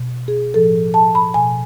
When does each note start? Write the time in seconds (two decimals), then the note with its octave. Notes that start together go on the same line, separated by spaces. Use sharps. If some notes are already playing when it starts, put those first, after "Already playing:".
Already playing: B2
0.28 G#4
0.54 A2 F3 A4
0.94 A5
1.15 B5
1.34 B2 G#5